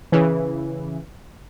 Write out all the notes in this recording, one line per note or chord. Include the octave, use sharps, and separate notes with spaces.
C#3 E3